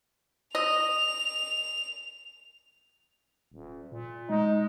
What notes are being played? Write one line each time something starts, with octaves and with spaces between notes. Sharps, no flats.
D#5 F7
D#1
A#2
G#3 D#4